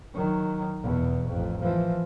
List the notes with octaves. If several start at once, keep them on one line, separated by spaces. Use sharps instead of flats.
D#3 F#3
E2 B2
A1 F2
E3 F3